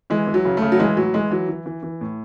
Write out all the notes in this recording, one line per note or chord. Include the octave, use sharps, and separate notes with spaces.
E3 G#3
E3
F#3
C#3
A3
C#3
F#3
E3 G#3
A2 F#3
E3 G#3
E3 F#3
E3
E3
E3
A2